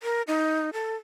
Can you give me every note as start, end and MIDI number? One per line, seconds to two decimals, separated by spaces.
0.03 0.22 70
0.28 0.70 63
0.73 0.96 69